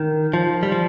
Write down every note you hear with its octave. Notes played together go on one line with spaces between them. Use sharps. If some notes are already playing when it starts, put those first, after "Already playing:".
Already playing: D#3
F3
G3
F3